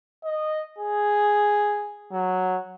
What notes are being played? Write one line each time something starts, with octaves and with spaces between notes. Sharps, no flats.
D#5
G#4
F#3